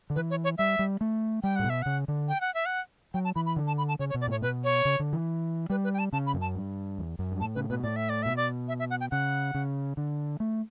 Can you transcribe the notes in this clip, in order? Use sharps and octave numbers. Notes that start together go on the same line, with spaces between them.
D3
E3 B4
C#5
C#5
G3 E5
G3
A3
G3 G5
A2 F#5
B2
E5
C#3 F#5
D3
G5
F#5
E5
F#5
F#3 G5
A5
E3 B5
B5
D3
A5
B5
A5
C#3 C#5
C#5
B2
D5
A2 C#5
B2 B4
C#5
C#3
D3
E3
G3 B4
B4
G5
A5
C#3 A5
B5
F#2
A5
G2
E2
F#2
G2
A2 A5
C#3 B4
B2 B4
A2 D5
E5
D5
B2 E5
D5
E5
E5
F#5
G5
C#3 F#5
C#3
D3
A3